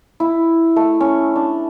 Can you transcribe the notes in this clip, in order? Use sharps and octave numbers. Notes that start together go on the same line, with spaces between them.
E4
A3
C#4
D4